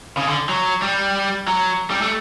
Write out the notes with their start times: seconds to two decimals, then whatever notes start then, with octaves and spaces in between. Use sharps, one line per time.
0.17 C#3
0.28 D3
0.49 F#3
0.82 G3
1.48 F#3
1.90 G3
2.02 A3